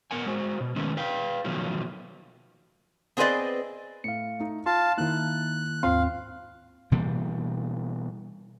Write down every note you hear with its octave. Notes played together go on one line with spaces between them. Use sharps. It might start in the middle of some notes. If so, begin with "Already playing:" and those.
B3 A#4 F#5 G#5
G#3 F#4 C5
B2
D#3 G#3 A3 B3 C#4
B4 F5 G5
B2 D#3 F3 F#3 A3
B3 C4 G#4 B4 D5 D#5
A2 F5 C#7
A3 D#4
F4 F5 A5 C6
D#3 A#3 D#4 E4 F#6
D#2 G#2 C4 F4 F5 C6
B2 E3 G3 A#3